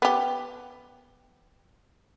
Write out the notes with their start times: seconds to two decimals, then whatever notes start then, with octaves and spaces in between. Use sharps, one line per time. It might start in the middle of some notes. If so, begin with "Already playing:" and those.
0.02 B3 G4